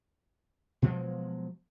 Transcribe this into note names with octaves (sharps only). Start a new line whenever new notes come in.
B2 F3 F#3 G#3